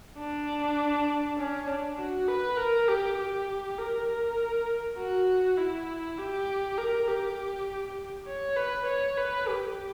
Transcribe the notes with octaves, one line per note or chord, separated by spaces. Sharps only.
D4
C#4
D4
F#4
B4
A#4
G4
G4
A#4
F#4
E4
G4
A#4
G4
C#5
B4
C#5
B4
G4